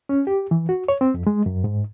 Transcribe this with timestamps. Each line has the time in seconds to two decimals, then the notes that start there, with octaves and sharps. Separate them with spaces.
0.09 C#4
0.27 G4
0.51 E3
0.69 F#4
0.88 C#5
1.01 C4
1.14 F2
1.27 G#3
1.46 F#2
1.64 G#2